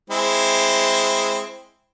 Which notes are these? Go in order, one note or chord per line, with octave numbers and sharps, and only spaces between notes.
G#3 C4 E4